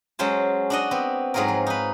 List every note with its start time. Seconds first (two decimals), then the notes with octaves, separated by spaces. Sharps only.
0.19 F#3 G#3 C#4 C5 A5
0.70 D4 F#4 D#5
0.91 B3 C4
1.34 G#2 F#3 F4 G#4 A#4
1.48 F3
1.67 D#4 B4